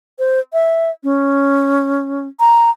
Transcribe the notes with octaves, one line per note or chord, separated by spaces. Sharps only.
C5
E5
C#4
A#5